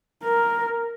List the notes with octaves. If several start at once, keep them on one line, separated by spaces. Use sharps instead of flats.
A#4